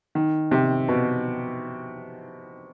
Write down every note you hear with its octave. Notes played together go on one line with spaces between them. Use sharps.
D#3
C3
B2